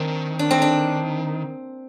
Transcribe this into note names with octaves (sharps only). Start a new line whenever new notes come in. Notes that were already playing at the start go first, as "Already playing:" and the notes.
Already playing: D#3 A#3 C4 D4
D4
C4
D4